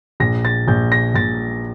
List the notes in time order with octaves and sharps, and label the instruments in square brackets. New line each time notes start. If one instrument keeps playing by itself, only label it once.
[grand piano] A#1 A#6
A6
A#1 G6
A#6
A#1 A6